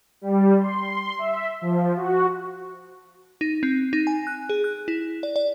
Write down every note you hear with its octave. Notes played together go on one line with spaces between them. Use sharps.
G3
C6
E5
F3
F#4
D#4
C4
D#4
G#5
F#6
G#4
F#6
E4
D5
D5